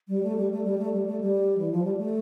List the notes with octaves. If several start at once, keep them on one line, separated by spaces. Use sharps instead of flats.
G3
A3
G3
A3
G3
A3
G3
A3
G3
E3
F3
G3
A3